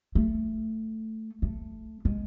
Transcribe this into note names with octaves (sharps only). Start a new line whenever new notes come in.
A3
A3
G#3